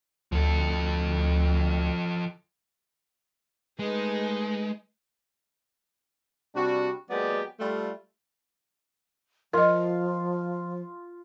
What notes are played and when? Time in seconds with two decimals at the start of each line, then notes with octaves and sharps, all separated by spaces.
0.32 D2 F3 A4
3.79 G#3 A3 D#4 B4
6.56 C3 G3 D4 F#4
7.11 F#3 G#3 A#3 B3 G4 D5
7.60 G3 A3 F4
9.53 F3 F4 A#4 D#5